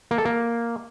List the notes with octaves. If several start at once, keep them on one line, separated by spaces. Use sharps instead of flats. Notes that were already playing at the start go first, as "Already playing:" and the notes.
A#3
A4
A#3